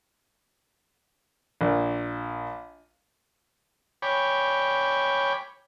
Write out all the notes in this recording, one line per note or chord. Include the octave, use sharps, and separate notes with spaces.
A#1
C#5 G5 G#5 B5 D6